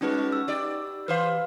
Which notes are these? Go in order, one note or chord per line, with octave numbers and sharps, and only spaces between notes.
G3 G#3 C#4 D#4 F#4 B4
E6
D#4 G4 D5
E3 G4 B4 C5 F5